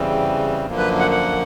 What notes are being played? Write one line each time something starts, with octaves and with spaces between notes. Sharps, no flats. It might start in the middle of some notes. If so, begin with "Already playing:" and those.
Already playing: E2 C#3 E3 G3 C4
F#2 D3 F3 A#3
B4
F#5
F#5